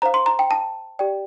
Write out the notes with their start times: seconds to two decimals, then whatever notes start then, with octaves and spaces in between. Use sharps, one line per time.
0.02 C5 F5 A#5
0.14 C6
0.26 A#5
0.39 G5
0.51 A5
0.99 G4 D5 G5